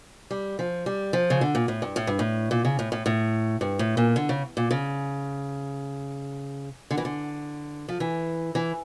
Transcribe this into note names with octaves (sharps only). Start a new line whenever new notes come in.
G3
F3
G3
F3
C#3
D3
A#2
A2
G2
A2
G2
A2
A#2
C#3
A2
A2
A2
G2
A2
A#2
D3
C#3
A#2
C#3
D3
E3
D3
F3
E3
E3